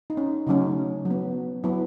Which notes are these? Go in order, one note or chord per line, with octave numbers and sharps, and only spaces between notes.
D#4
C#4
C#3 F#3 A3 C#4 D#4
F#3
B3
F#3 B3 E4